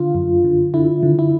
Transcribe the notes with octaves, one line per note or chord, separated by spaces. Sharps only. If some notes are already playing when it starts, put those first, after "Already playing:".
Already playing: D3 F4
F#2
D3
D3 E4
D3
E4